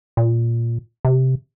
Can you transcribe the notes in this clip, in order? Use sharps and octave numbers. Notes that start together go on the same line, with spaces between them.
A#2
C3